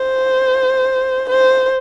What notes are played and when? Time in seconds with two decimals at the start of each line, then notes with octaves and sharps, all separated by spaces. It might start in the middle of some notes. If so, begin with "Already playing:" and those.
Already playing: C5
1.29 C5